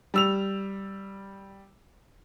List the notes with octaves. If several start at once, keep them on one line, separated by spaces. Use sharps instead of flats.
G3 E6 F7